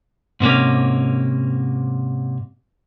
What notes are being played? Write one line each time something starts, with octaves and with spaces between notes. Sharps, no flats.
G#2 C3 A#3 C#4